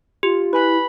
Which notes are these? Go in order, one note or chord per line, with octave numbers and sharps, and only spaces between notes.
F4 G4
E4 B4 G#5 B5 F#6